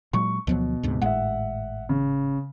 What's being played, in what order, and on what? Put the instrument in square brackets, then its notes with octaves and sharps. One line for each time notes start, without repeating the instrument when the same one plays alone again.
[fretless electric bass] A#2 F#3 G#3 [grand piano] C#6
[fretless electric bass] D2 F3 F#3 [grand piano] B2
[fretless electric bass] D2 G#2 C3
[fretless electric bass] G#1 A2 G#3 [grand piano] E5 F#5
[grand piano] C#3